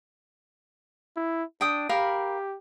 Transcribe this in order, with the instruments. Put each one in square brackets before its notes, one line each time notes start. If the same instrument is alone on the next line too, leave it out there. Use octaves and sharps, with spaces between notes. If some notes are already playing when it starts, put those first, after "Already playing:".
[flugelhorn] E4
[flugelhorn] D4 [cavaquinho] G5 D#6
[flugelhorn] G4 [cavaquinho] A#4 F5 B5